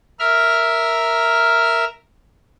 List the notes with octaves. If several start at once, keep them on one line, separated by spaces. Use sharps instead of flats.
A#4 E5 F6